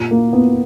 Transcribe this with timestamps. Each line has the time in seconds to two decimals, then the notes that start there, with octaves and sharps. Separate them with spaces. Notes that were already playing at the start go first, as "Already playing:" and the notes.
Already playing: A#2
0.11 A#3
0.33 B3